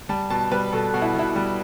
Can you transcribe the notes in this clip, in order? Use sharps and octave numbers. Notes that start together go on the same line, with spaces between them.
G3 A5
B2 A5
G3 B4
B2 A4
B2 F#4
E4
B2 E4
G3